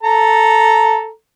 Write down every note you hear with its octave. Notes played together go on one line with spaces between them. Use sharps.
A4 A#5